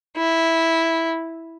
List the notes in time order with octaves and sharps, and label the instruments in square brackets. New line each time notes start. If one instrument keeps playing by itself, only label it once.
[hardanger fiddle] E4